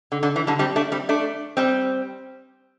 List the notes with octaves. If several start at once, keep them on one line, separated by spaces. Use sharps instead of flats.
D3
D3
E3
D3 G3
G3 C4
A3 D4
G3 C4
A3 D4
G3 C4